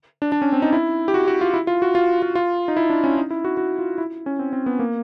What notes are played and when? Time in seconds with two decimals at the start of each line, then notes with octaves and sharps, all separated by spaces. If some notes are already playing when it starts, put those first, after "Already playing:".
0.22 D4
0.32 D4
0.42 C#4
0.53 C4
0.62 D#4
0.73 E4
1.08 G4
1.14 F#4
1.28 F#4
1.41 F4
1.54 E4
1.67 F4
1.82 F#4
1.95 F4
2.22 F4
2.35 F4
2.68 D#4
2.77 E4
2.90 D4
3.04 C#4
3.17 D#4
3.31 E4
3.44 F#4
3.57 F#4
3.79 F4
3.98 E4
4.26 C#4
4.39 C4
4.53 C4
4.66 B3
4.79 A#3